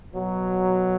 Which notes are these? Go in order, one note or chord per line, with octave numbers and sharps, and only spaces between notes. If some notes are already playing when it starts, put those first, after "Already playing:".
B2 F#3